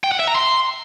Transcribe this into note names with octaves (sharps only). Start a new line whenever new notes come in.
G5
F#5
E5
A#5
C6